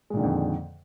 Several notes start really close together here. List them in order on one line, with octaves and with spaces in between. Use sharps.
G#3 A#2 D#3 D3 F2